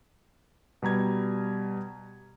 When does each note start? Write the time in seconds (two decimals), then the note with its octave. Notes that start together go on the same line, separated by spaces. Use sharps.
0.82 B2 G3 A#5 G#6